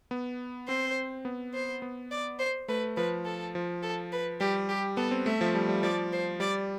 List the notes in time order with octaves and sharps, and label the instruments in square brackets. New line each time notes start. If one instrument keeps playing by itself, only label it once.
[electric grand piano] B3
[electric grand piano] C4 [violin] C5
[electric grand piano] B3
[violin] C5
[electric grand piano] B3
[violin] D5
C5
[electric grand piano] A3 [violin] B4
[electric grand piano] F3 [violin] B4
[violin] A4
[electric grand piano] F3
[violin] A4
B4
[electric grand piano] G3 [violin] G4
[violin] G4
[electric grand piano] B3 [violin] A4
[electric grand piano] C4
[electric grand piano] A3 [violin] E5
[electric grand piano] F3
G3
G3
[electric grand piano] F3 [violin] D5
[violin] C5
[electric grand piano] G3 [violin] D5